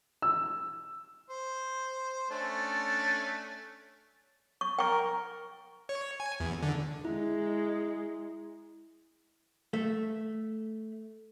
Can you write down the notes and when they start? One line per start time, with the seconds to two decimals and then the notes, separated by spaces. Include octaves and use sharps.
0.22 E6
1.30 C5
2.31 A3 C#4 D4
4.61 C#6
4.79 A#4 G5 C#6
5.89 C#5
6.20 G#5
6.40 E2
6.63 D3
7.05 G#3 E4
9.73 A3